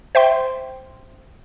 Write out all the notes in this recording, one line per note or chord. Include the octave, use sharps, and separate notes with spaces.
C5 E5 G5 C6